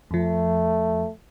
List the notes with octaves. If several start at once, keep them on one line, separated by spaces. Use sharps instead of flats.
F2 F3 A3